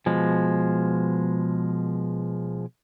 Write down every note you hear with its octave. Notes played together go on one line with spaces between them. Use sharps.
B2 F3 G#3